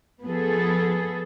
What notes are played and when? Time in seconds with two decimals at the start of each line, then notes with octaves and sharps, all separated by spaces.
0.23 F3 B3 G#4 A4